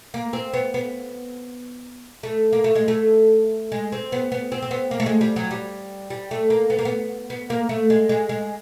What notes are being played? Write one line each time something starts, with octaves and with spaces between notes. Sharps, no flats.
A#3
C4
B3
B3
A3
A#3
A3
G#3
A3
G#3
C4
B3
B3
C4
C4
B3
A#3
A3
G#3
G3
F#3
G3
G3
A3
A#3
B3
A#3
B3
B3
A#3
A3
G#3
G#3
G#3